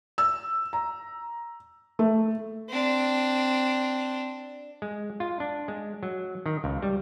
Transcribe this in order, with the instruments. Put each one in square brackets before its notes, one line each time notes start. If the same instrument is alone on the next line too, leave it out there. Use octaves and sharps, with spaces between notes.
[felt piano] E6
A#5
A3
[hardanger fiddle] C4 D4
[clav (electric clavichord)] G#3
F4
D4
G#3
F#3
D#3
C#2
G3